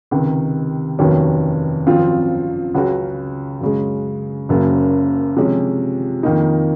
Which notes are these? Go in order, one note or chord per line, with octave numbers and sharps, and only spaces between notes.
C#2 C3 D#3
F1 D#2 D#3 F#3 C#4
G#1 F#2 F3 C4 F4
C#2 C#3 F#3 C#4 F#4
F#2 C#3 G#3
F#1 F#2 C#3 F#3 A#3
C3 F3 G#3 C#4
F2 D#3 A#3 D#4